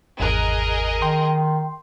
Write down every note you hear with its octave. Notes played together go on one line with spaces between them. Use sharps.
G#1 E2 G#4 A#4 D#5 F#6
D#3 G5 C6